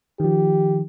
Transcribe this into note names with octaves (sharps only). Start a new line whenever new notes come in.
D#3 F3 G4